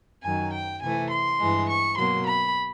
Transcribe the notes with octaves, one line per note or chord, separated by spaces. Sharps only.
F#2 D#3 F#3 G#5
G5
C3 E3 A3 G#5
C6
G2 E3 G#3
C#6
B2 F#3 A#3 C6
B5